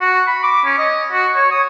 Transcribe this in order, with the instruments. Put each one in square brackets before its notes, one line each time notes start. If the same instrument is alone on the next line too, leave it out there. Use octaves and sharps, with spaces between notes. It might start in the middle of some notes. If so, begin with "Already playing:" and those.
[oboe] F#4
B5
D6
C#4
D#5
F#4
C#5
D#6